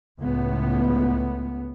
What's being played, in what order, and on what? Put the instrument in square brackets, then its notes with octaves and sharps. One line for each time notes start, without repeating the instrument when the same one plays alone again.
[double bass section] C#2 A2 B3